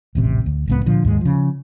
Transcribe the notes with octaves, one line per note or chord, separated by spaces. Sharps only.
D#1 A1 C3
D2
D1 C#2 B3
A#2 D3 F3
D#2 G#2 G#3
C#3 F3